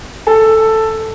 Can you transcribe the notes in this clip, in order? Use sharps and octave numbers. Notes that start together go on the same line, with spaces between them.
A4